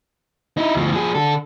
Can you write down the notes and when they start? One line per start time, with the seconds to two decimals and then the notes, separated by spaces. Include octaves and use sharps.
0.57 D#4 E4
0.75 D2 F3
0.93 F3 G#4
1.15 D3 A4